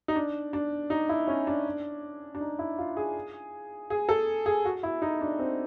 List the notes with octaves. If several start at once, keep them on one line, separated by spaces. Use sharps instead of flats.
D#4
D4
D4
D#4
E4
C#4
D4
D4
D#4
E4
F4
G#4
G#4
A4
G#4
F#4
E4
D#4
D4
C4